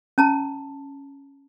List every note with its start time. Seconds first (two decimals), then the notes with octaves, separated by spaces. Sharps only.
0.18 C#4 A5 A#5